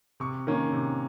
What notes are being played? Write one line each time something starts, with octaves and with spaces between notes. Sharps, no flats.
C3 C#6
D#3 A#3 C#4
C3